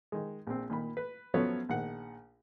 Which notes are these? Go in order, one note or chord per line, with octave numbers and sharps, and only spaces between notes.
D#3 G#3
A#1 C4
A#2 D#3 B5
B4
F3 F#3 A3 B3 C#4 C#5
A#1 D#3 F#5